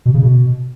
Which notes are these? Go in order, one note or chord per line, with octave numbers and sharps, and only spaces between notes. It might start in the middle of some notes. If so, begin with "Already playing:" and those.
B2
C#3
B2